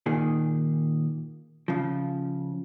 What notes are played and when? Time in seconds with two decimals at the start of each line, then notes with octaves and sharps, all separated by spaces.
0.06 A#2 D#3 G#4
1.68 C#3 F3